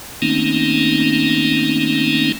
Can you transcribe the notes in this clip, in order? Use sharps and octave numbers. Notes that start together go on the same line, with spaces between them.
D#3 A3 A#3 C4 C#4 D#4